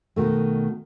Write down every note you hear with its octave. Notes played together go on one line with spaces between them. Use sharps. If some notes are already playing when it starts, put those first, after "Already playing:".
B2 D#3 A3